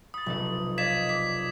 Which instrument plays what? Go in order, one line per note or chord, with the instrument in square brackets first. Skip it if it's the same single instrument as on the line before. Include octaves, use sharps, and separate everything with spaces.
[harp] B5 A6 [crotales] D#6
[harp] F1 B1 A4
[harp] D5 D#5 F5 [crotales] G#6 B6 E7
[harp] D6 [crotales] B6